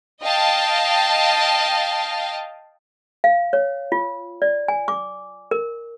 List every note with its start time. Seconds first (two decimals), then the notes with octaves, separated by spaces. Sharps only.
0.23 D#5 F5 G5 A5
3.24 F5
3.53 C#5
3.92 F4
4.42 D5
4.68 G#5
4.88 D6
5.51 A#4